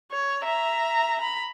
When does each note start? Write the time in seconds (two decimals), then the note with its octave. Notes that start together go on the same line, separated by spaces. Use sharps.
0.12 C#5
0.43 E5 A#5
1.19 A#5 B5